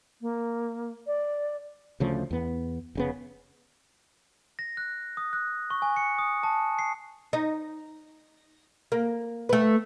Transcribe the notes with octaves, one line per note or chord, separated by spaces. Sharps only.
A#3
D5
D2 C#3 F3 A3
E2 B3
F1 C#3 B3
A#6
F#6
D#6
F#6
C#6
G#5
C#7
D#6
A5
C7
D#4
A#3
A3 B4